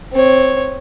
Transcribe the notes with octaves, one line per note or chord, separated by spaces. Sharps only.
C4 C#5